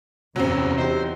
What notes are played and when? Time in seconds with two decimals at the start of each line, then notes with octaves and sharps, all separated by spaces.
0.36 E2 C3 F#3 C4 C#4
0.78 D#4 E4 G4 C5